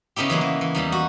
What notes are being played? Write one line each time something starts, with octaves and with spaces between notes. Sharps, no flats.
C#3 B3 D#4 E4 G4
E3 F#3 G#3 A#3
E3
E3
E2 G3 D#4
F#4